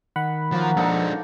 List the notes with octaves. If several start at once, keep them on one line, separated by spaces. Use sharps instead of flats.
D#3 F#5 B5
F3 F#3 A#3 F#4
F3 G#3 A#3 D4 D#4 A4